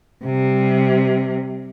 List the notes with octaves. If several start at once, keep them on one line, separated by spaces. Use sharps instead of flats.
C3 G3